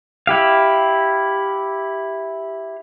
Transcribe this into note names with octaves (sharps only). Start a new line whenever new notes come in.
E4 G4 F5